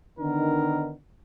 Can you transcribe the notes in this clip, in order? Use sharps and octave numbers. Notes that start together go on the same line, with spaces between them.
D3 D#3 B3 D4 D#4 A#4